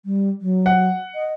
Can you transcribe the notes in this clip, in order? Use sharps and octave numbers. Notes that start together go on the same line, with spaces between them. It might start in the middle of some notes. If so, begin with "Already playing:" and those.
G3
F#3
F#5
D#5